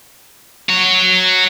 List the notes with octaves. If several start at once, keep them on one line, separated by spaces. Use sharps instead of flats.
F#4 C#5